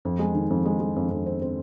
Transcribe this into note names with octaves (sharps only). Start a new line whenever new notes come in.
F2
G#3
D#3
F2
G#3
G#3
F2
F2
C4
C4